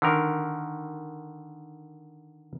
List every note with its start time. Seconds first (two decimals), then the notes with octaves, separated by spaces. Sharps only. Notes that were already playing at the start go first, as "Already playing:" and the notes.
0.02 D3 D#3 A#4